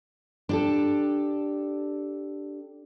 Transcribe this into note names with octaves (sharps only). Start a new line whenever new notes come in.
D4 G4 A4